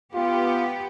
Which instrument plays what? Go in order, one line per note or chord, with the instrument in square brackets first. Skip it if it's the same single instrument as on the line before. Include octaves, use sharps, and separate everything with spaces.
[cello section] B3 G4 [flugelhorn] F4